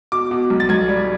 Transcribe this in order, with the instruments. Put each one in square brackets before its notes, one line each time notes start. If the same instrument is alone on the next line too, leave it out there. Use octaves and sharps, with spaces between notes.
[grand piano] B2 D6
B2
B1
A6
B1 G#6
G3